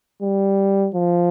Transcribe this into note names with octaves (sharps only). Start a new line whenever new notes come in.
G3
F3